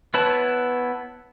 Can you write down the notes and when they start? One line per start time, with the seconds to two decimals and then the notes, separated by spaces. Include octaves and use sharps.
0.14 B3 E4 B4 C#5 A5